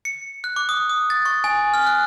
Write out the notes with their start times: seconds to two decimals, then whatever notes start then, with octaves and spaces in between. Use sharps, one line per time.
0.05 C#7
0.44 F#6
0.56 D6
0.69 D#6
0.89 D#6
1.10 A6
1.26 C#6
1.44 G#5
1.74 F6
1.87 F#6